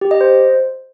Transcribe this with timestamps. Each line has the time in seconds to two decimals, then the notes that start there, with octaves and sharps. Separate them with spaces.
0.01 G4
0.11 D#5
0.21 C5